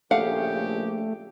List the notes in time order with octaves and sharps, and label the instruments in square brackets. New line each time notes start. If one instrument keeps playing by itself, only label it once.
[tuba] A#1 [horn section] A2 C#3 G4 [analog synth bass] A3 [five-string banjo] F5 F#5